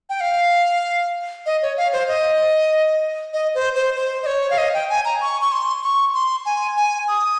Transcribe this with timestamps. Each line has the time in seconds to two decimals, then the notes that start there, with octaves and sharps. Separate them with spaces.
0.09 G5
0.21 F5
1.46 D#5
1.62 C#5
1.77 F5
1.93 C5
2.08 D#5
3.33 D#5
3.55 C5
3.75 C5
3.96 C5
4.23 D#5
4.26 C#5
4.50 F5
4.58 D#5
4.74 G5
4.90 G#5
5.05 A#5
5.21 C#6
5.42 C#6
5.52 C6
5.83 C#6
6.14 C6
6.46 G#5
6.77 G#5
7.08 D#6